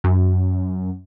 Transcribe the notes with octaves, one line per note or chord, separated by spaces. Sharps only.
F#2